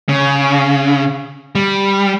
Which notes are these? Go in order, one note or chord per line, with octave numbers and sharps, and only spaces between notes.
C#3
G3